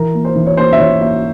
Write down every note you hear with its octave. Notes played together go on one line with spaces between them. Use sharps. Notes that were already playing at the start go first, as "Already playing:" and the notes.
Already playing: E3 A#4
A#3
C5
E3
C#5
A#3 C5
E5
E3 C#5
A#3 E5